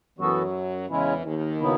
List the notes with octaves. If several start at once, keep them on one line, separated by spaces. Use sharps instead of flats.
F#2 E3 F#3 B3 F#4 A4
E2 C#3 E3 G#3 C#4 E4
D#2 D#3
C#3 F#3 B3 E4